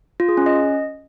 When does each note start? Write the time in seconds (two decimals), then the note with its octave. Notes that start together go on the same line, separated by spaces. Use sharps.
0.20 F4
0.29 G#4
0.37 C#4
0.46 D#5